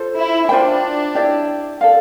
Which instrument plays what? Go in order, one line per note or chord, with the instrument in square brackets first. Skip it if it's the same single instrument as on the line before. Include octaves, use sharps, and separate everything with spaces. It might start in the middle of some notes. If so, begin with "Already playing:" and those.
Already playing: [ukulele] F4 A4 C5
[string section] E4
[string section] D4 [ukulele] F4 C5 G5
[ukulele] E4 G4 D5
A4 D5 F5